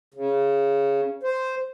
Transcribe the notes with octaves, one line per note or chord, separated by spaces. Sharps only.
C#3
C5